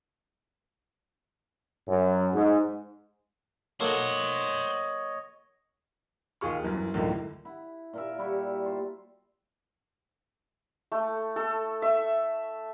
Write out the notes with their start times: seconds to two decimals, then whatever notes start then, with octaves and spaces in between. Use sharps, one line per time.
1.88 F#2
2.34 G#2
3.80 F#3 A#3 A4 C5 C#5 D#5 F#5
6.41 D#2 F4 G#4 C#6
6.63 G1 F#2 E3
6.94 C#2 F#2 A2 D3 D#3
7.45 E4 F#5
7.93 A#2 A#4 E5
8.19 G3 E4 F#4
8.65 F4 C5
10.92 A3
11.36 A4
11.82 E5